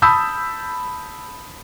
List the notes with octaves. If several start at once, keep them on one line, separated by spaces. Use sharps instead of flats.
A5 B5 D#6 E6 G6